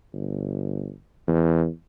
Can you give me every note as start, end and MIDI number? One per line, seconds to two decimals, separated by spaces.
0.13 0.91 31
1.27 1.67 40